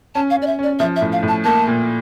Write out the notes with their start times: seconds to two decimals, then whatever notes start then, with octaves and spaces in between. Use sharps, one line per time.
0.15 C#4 A5
0.30 F5
0.37 C#4
0.42 D5
0.47 E5
0.59 C#4 D5
0.79 F3 E5
0.96 E5
1.01 A2
1.12 F5
1.23 A2
1.28 A5
1.44 A#3 A5
1.67 A#2